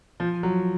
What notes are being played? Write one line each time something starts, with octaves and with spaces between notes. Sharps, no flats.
F3
F#3